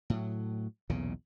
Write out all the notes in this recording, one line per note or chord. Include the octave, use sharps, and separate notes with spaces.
A2 F#3
B1 E2 A#2 C#3